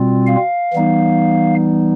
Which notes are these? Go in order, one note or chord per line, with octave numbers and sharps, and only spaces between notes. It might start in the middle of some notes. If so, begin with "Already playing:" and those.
Already playing: B2 G3 C4 F4
F5
E3 G3 B3 D#4